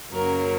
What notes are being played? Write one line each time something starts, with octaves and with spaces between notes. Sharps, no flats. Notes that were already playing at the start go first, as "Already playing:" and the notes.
F#2 C#3 F#3 A#3 A#4